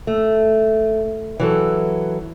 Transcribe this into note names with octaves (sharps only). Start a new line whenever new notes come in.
A3
E3 F#3 A4